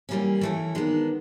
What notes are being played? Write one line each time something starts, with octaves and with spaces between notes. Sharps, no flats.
E3 G3 A#3 C#4
E3 A3 C#4 E4
D#3 G#3 B3 D4